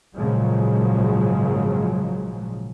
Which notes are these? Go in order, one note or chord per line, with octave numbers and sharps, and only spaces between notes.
G#1 A#2 C#3 F3 F#3 G#3